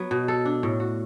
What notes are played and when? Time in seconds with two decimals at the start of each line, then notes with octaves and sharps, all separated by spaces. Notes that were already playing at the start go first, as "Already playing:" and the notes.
Already playing: F#3 B3
0.11 B2
0.28 A4
0.45 D4
0.63 A2
0.80 F#4